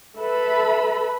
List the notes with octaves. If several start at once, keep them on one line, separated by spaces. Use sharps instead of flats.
A4 B4 E5 B5